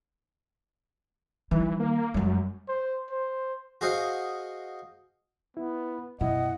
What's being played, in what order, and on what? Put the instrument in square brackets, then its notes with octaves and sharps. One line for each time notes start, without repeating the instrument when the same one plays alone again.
[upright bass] D#3 G3 [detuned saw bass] E3
[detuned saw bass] A#3
[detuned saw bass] F#2 [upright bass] G3 G#3
[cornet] C5
C5
[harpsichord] F#4 G#4 C5 D#5 F5 F#5
[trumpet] B3 [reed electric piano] E4
[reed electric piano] F#2 E4 [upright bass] B2 [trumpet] D#5 [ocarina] F#5